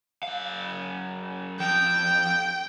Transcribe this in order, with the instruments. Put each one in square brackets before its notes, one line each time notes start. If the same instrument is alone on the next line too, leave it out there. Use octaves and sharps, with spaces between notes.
[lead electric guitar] F#2 F5
[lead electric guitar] F2 [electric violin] G5